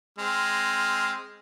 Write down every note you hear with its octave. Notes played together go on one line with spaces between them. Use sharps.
G#3 C4 F6